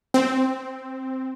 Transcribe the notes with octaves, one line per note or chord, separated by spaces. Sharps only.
C4